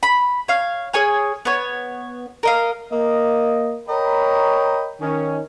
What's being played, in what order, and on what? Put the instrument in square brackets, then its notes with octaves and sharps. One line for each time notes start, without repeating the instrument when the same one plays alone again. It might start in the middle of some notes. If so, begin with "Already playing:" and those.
[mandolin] B5
C#5 F5
G#4 C#5 G#5 F6
B3 C#5
A#4 D#5 F5
[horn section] A#3 D#5
A#4 C#5 D#5 G5 A#5 B5
D#3 C#4